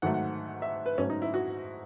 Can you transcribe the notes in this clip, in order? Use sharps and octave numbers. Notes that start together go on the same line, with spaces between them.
G#2 D#3 F#3 A3 F#5
F#5
E5
B4
G#2 F#3 A3 C#4
D#4
E4
F#4